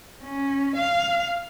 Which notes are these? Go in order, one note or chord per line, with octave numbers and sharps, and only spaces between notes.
C#4
F5